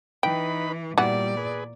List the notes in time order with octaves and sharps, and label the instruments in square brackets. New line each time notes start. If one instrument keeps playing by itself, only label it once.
[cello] E3 [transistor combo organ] D#4 B4 B5 [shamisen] G5
[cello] A#2 D5 [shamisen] E3 B3 F#4 [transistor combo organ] G3
[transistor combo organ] G#4 B4